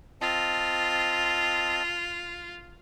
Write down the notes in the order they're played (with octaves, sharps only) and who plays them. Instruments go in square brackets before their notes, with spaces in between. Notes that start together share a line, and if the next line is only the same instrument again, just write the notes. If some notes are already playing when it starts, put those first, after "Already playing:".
[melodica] C4 D#5 A5 [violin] F4